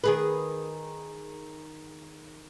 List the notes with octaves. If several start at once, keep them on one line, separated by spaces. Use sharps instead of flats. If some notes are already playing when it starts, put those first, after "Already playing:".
D#3 G#4 B4